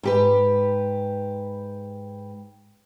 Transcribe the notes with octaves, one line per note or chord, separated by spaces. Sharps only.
G#2 G4 B4